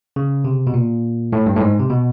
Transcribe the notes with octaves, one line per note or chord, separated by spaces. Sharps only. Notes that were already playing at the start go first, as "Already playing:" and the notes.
C#3
C3
B2
A#2
A2
G2
A2
G#2
C3
B2